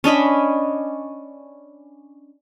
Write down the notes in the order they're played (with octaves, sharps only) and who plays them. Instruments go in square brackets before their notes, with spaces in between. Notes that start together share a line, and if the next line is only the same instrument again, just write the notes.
[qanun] C#4 D4 D#5 B5